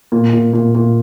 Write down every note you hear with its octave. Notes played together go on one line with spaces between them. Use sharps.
A#2
A#2
A#2
A#2